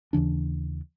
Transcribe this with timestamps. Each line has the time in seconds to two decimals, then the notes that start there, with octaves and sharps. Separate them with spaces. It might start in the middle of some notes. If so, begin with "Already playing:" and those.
0.13 D#2 C#3 E3 D4